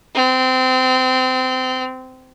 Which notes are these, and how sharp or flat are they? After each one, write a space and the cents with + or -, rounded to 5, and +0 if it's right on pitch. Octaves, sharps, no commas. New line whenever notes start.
C4 -25